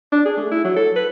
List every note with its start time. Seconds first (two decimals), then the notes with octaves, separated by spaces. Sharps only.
0.12 D4
0.26 G#4
0.37 A3
0.52 E4
0.65 F#3
0.76 A4
0.96 B4